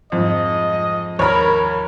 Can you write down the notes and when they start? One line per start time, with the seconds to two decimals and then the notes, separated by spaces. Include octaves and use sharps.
0.12 F2 G#2 F3 D#5
1.19 D#2 A#4 C#5 B5